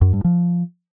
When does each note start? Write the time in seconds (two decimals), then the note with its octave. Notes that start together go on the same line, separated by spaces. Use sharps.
0.01 F#2
0.13 G2
0.24 F3